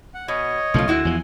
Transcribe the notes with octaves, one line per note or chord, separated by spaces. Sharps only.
F#5
B2 C#5 D#5
B1 C#3 F3 A3 F4
D2 G#3 E4 F#4
E2 F3 G#5